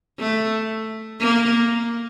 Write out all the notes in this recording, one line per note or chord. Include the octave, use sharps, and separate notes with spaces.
A3
A#3